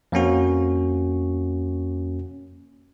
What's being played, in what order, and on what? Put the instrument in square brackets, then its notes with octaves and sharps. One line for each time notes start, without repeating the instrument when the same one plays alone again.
[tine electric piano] F2 A#3 C#4 F#4